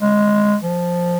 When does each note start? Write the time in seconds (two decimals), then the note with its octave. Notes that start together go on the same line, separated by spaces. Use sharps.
0.02 G#3
0.63 F3